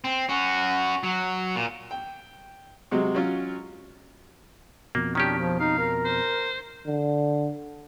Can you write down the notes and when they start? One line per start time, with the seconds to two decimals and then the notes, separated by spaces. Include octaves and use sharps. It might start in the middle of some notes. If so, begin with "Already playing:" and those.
0.04 C4
0.29 C#4 F#4
1.03 F#3
1.56 A#2
1.91 G5
2.91 C3 F#3 G#3
3.15 F#3 C#4 F4
4.95 F2 B2 A#3
5.15 D#3 C#4 D4 G4
5.39 F3
5.60 D#4 F5
5.79 A#4
6.05 C5
6.87 D3